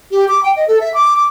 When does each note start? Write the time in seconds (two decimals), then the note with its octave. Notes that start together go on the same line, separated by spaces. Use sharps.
0.11 G4
0.28 D6
0.43 G5
0.56 D#5
0.68 A4
0.80 E5
0.94 D6
1.17 D6